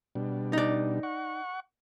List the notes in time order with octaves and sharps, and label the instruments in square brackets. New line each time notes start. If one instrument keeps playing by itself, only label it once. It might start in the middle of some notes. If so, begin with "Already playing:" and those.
[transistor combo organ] B2 G3 D4
[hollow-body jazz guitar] D#4 D5
[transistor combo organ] F#5 C#6